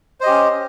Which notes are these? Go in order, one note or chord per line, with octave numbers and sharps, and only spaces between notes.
C#4 G4 C5 D#5